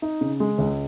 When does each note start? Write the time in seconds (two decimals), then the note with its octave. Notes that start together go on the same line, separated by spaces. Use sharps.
0.02 D#4
0.21 C#3
0.40 G#3
0.58 C#2